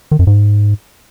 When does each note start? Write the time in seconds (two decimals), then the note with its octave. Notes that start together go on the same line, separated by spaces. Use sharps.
0.11 D#3
0.19 F#2
0.27 G#2